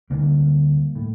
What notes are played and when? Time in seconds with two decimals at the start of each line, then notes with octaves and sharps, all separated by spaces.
0.10 D2 D3 G3 A#3
0.95 A2